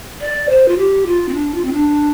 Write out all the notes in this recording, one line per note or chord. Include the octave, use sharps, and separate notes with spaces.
D5
C5
F4
G4
F4
C4
D4
F4
C4
D4